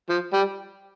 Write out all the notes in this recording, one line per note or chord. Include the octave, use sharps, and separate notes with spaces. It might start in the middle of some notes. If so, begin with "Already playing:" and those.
F3
G3